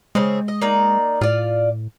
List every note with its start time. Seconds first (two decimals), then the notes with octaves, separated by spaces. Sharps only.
0.15 C#3 G#3 C4 G#4
0.48 D#5
0.61 A#3 D#4 D5
1.21 A2 F4 D5